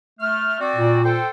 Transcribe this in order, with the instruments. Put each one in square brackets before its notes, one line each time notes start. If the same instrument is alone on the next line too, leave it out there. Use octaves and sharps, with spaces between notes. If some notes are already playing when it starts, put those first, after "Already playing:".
[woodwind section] A3 F6
C4 F#4 D5
[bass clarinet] A#2
[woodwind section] A4 C5 G5